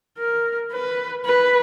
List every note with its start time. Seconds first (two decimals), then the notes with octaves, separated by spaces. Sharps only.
0.18 A#4
0.72 B4
1.25 B4